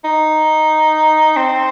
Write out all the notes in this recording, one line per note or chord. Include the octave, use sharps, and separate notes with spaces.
D#4
C4